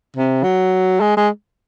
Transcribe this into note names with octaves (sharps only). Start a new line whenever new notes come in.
C3
F#3
G#3
G#3